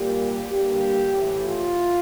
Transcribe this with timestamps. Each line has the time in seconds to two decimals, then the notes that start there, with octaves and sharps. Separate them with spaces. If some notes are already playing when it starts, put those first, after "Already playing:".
Already playing: A#2 G3 A#3 G4
0.53 G2 D3 G3 A#3 G4
1.15 A2 E3 A3
1.46 F4